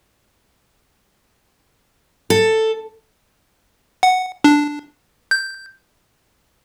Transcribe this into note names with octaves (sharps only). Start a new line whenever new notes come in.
A4
F#5
D4
G6